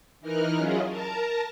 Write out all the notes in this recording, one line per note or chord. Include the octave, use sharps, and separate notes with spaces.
E3 D#4 A#4 F6 F#6
F#3 C#4 E4 F4 G#4 D#5
A#4 A5 A#5